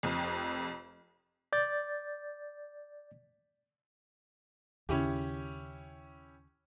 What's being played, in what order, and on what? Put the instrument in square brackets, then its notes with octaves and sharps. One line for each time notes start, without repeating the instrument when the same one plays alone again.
[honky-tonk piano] F1 F2
[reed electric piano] D5 G6 A6
[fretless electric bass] D#2 C#3 [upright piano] C#4 E4 G4